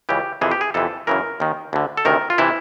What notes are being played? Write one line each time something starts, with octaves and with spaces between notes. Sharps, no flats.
C#2 C#3 E3 G4
F2 C3 E3 G#4
G4
G#4
F2 C3 E3 A4
F#2 C#3 E3 A#4
D#2 D#3
D2 D3
A4
D2 C3 D#3 A#4
F4
C3 E3 E4